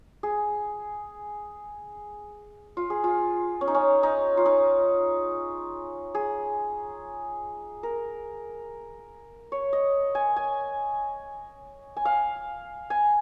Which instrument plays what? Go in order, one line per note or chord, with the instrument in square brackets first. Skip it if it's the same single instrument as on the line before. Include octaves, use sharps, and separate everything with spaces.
[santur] G#4
F4
G#4
F4
C#4
D#4
C#4
D#4
F4
D#4
G#4
A#4
C#5
D#5
G#5
G#5
G#5
F5
G#5